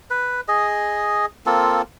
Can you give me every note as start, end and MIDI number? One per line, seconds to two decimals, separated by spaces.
0.11 0.41 71
0.48 1.26 68
0.48 1.26 75
1.46 1.82 58
1.46 1.82 60
1.46 1.82 65
1.46 1.82 69